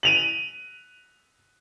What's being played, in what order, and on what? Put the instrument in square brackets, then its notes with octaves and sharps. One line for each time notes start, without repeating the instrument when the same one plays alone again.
[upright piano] D#7 F7 F#7